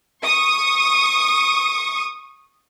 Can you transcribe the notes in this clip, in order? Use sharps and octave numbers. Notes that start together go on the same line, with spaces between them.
C#6 D#6